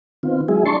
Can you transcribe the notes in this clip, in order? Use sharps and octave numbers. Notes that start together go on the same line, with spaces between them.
D#3 B3 C4 F4
F#3 G#3 E4 G#4
D4 A5 C6 C#6